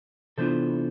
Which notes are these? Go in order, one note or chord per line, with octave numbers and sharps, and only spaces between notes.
C3 E3 B3 D4 F4 A4 C5